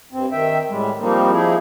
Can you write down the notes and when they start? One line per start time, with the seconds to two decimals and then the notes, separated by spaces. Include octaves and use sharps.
0.12 G2 C4
0.32 D#3 E5 G5
0.69 A2 G3 G#3
1.00 F3 G3 A#3 C4 D#4
1.31 F3 D#4 E4 G#4